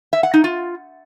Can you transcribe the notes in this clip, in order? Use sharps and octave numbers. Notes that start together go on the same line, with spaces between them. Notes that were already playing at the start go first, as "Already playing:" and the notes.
E5
F#5
D#4
F4